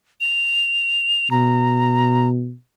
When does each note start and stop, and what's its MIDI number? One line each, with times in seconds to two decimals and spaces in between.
0.21 1.31 101
1.31 2.53 47
1.31 2.28 82